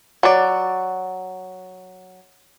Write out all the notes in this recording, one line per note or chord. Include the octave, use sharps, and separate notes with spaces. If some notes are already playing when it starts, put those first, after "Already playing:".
F#3 D5